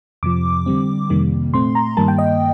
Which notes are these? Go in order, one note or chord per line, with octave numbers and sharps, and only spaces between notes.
F2 C3 F3 D6
D3 G3 C4
F2 C3 D#3 G3 A#3
A#2 A3 C4 C6
A#5
G2 D#3 G3 A#3 A5
G5
D#5